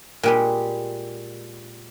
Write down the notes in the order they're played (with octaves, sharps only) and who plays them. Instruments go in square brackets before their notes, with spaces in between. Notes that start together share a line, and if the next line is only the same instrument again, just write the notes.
[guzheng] A#2 G3 G#3